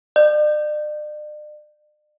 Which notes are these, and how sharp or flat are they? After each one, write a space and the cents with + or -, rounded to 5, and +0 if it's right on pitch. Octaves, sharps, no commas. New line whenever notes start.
D5 +40